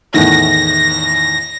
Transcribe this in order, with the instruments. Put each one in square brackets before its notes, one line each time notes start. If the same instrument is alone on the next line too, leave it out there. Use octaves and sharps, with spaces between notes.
[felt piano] E2 A2 D#3 [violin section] A#6